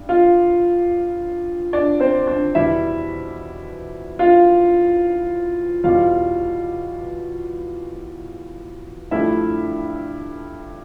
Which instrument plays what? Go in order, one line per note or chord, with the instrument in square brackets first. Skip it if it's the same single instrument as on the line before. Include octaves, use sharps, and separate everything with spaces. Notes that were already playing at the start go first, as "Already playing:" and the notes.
Already playing: [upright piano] G2
F4 F5
D4 D5
C4 C5
D4 D5
E2 B2 G3 E4 E5
F4 F5
E2 B2 G3 F4 F5
G2 F3 A3 E4 E5